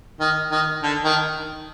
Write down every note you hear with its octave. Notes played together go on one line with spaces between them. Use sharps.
D#3
D#3
D3
D#3